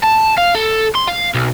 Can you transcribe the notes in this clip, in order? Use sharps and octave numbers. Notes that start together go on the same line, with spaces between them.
A5
F5
A4
C6
F5
B1